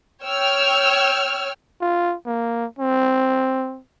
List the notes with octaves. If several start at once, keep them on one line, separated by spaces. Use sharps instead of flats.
C#5 G5 E6 F6
F4
A#3
C4